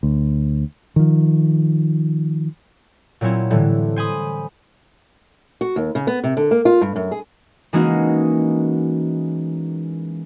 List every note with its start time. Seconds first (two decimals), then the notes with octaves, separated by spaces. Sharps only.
0.03 D2
0.96 D#3 F3
3.21 A#2 F#3 C4 C#4 E4
3.50 A2 D3 E3 G3
3.96 C5 G#5 B5 D#6
5.61 F#4
5.76 D#2
5.95 C#3
6.07 B3
6.23 C3
6.37 D3
6.51 A#3
6.65 F4
6.81 G2
6.96 F#2
7.11 G#4
7.73 E3 G#3 A#3 C#4 D#4 F#4